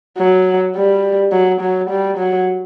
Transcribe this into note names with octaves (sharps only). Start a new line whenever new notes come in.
F#3
G3
F#3
F#3
G3
F#3